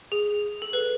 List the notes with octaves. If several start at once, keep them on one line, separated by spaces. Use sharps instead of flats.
G#4
A4
B4